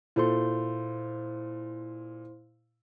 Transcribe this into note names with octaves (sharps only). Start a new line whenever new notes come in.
A#2 E4 A4 C5 C6